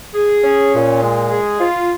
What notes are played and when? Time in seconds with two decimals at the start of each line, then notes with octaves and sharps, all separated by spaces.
0.14 G#4
0.43 C#4
0.73 A#2
1.01 G#3
1.30 G#4
1.59 F4